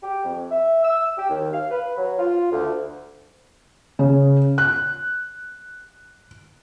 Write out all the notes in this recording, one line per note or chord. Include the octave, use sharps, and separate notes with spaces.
G4
F2
E5
E6
G4
D#2
F5
B4
F#3
F4
D2
C#3
F#6